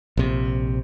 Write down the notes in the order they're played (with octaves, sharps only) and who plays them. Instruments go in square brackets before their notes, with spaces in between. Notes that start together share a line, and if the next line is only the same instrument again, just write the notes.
[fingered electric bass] A#1 C3